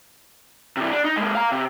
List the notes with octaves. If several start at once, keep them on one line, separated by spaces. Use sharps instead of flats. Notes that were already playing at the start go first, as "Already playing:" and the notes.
C3 E3
D4
D#4
G#3 A#3
F5 A#5
C3